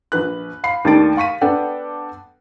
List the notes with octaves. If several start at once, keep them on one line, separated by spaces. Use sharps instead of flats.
A#1 B4 F#6
F5 B5 C7
D#2 D#3 A3 D4 A6 D7
F5 C#6 B6 D#7
B3 D4 A4 F#5 G5